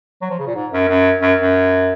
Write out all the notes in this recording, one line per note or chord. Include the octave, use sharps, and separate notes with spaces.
F#3
F3
C#3
A#2
G#2
F#2
F#2
F#2
F#2